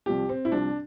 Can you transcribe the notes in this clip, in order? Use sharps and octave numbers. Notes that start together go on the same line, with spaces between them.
C2 C3 F3 G4
C4
E4
C2 C3 F3 D4